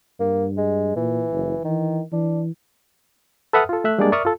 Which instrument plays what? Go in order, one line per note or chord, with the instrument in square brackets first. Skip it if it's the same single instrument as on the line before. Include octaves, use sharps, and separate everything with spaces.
[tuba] G2 [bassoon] A#3
[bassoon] G#3
[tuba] A#2 [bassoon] E3
[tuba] F#1
[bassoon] D#3 [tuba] E3
[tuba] E3 [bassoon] D4
[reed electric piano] A4 B4 E5 F#5 D#6 F6
F4 A4
A3 E5 F#6
G3 G#3 A#3 D4 G#4 D5
A#4 D5 E5 C#6 D#6 F6
F4 A4